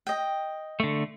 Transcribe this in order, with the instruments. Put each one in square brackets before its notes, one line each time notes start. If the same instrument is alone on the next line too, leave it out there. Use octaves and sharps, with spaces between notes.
[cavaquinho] D#5 G5
[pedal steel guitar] D3 A3